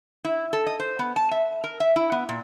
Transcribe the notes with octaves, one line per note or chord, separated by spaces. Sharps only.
E4
A4
D#5
C5
B3
A5
E5
A#4
E5
E4
B3
A#2